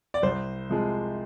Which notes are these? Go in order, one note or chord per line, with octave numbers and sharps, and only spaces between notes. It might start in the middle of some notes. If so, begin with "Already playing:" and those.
D5
C2 C5
C3 F3 G#3